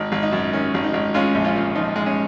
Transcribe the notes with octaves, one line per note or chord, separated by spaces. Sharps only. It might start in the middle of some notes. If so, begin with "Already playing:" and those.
Already playing: G#1 D#4
G#1
D#4
F#2
D#3 C#4
G#1
D#4
G#1
G#3 C#4 F4
A#1
C#4 F4
A#2
F3 D#4
G#3
C#4